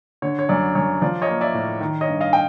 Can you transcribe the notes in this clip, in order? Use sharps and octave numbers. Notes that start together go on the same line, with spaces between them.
D3 C#5
C#5
F#2 D5
F#2 C#5
F3 D5
C#5 D#5
A#3
D5 E5
A2
D#3
C#5 D#5
G2
D#5 F5
G5